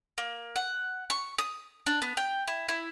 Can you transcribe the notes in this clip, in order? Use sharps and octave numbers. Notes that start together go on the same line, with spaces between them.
A#3
F#5
C#6
D#6
D4
B3
G5
E4
E4